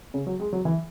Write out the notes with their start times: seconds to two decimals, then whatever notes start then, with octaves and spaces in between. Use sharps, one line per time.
0.14 C#3
0.27 F#3
0.40 G#3
0.53 F#3
0.65 E3